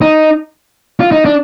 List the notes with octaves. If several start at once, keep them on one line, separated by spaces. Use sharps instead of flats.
D#4
F4
D#4
D4